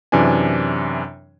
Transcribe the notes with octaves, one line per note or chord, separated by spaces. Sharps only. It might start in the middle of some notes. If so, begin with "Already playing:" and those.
F#2 C3 E3 D4 G#5